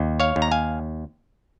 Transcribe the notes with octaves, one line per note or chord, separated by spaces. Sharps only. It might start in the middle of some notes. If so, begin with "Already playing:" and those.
Already playing: D#2
C#5 F5
D#2
A#5
F5 G#5